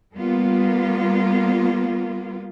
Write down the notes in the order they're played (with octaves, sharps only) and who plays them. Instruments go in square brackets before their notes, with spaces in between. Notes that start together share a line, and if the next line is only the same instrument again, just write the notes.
[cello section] G3 A#3 B3 F4